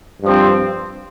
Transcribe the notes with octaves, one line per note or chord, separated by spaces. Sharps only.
G2 F3 C4